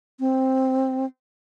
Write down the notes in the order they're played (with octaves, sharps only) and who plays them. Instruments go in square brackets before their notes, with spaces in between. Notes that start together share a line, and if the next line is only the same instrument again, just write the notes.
[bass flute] C4